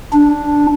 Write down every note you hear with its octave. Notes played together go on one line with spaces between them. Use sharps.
D4